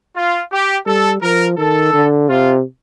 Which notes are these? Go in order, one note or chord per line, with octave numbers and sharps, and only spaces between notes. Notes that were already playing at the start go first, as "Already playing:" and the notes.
F4
G4
G3 A4
F3 A#4
D#3 A4
D3
C3 F4